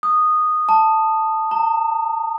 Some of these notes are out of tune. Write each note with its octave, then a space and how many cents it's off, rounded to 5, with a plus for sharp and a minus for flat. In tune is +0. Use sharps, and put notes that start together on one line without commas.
D#6 -10
A5 +5
A#5 -40